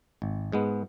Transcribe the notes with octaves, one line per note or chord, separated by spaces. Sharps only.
G#1
G#2 G#3 B3